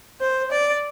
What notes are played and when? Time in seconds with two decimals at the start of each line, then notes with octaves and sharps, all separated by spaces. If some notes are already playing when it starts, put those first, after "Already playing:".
0.20 C5
0.51 D5